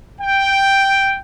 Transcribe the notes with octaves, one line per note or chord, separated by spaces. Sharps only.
G5